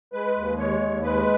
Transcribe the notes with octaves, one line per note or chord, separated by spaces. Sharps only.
G#3 B4
D#2
G#3 C#5
D#2
G#3 B4